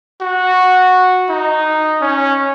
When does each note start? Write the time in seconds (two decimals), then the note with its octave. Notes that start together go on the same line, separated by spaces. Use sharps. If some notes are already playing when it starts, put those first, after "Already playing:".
0.21 F#4
1.29 D#4
2.01 C#4